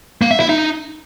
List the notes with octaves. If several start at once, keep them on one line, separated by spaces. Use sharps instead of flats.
A#3
E5
E4
D#4